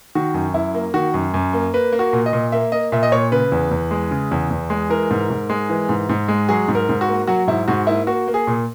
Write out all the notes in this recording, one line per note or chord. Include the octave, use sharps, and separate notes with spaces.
D#3 F#4
F#2
F#2 E4
A#3
D#3 F#4
F#2
F#2
A#3
A#3 B4
A#3
F#4
A#2
D#5
A#2
A#3 E5
A#3 D#5
A#2 E5
D#5
A#2 C#5
C#3 B4
E2
E2
G#3
C#3
E2
E2
G#3
E3 A#4
G#2
G#2
G#3
E3
G#2
G#2
G#3
F#3 G#4
G#2
A#4
G#2
F#4
A#3
F#3 F#4
G#2 E4
G#2 F#4
A#3 E4
A#3 F#4
A#3
G#4
A#2